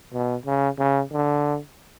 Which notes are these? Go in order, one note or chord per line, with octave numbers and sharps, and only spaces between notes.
B2
C#3
C#3
D3